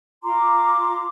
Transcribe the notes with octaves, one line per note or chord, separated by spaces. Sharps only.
F4 A#5 C6 D6